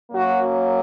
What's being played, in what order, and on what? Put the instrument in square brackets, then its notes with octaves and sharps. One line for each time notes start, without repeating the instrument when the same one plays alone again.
[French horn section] F#2 F#3 A#3 C#4 F#4